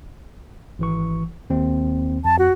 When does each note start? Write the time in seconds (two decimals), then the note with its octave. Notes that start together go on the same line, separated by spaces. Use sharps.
0.79 G#1 E3 C#6
1.50 D#2 C4
2.25 F2 A5
2.39 F#4